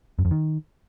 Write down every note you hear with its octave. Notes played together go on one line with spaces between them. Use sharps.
F#2
F2
D#3